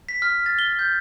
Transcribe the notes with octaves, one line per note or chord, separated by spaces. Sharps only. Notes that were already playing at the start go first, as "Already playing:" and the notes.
B6
F6
A6
G7
G6